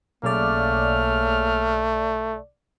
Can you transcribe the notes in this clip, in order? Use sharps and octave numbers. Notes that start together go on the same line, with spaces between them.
B1 C#3 A3 A#3 D5 F6